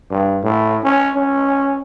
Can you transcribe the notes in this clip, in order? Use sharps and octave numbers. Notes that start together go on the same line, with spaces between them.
G2
A2
C#4
C#4